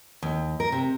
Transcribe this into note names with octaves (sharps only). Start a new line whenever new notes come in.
D#2
A#4
C3